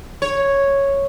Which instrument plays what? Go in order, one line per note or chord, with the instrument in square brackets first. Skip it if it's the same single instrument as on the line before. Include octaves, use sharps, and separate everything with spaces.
[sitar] C#5